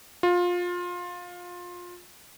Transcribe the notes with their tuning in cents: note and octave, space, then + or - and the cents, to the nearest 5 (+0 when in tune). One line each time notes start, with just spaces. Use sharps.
F4 +20